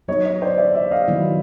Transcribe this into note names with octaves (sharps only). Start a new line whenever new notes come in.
F#3 B3 D#4 C#5 D#5
C#5 D#5
C5 D5
D5 E5
D5 E5
D#5 F5
D#3 F#3 B3 E4